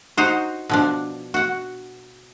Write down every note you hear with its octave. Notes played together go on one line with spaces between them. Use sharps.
D#4 F#4 C5
B2 F3 D4
F#4 F#5